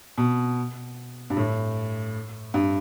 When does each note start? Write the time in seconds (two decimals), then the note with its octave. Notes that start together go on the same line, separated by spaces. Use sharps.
0.18 B2
1.30 G2
1.37 A2
2.54 G2